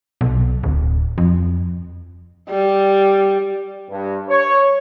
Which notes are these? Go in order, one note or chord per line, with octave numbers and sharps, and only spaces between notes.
B1
D1
F2
G3
G2
C#5